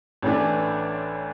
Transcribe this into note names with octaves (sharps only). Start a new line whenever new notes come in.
A1 A2 E3 A3 D4